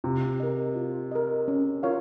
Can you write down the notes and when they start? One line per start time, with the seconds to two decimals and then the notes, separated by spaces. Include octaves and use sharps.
0.04 C3 F4
0.40 A#4 D#5
0.76 F4
1.12 A#4 D#5
1.48 C#4
1.83 F4 A#4 C#5 F5